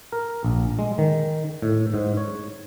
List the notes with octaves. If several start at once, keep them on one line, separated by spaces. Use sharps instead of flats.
A#4
A#1
G#3
D#3
A2
G#2
C#5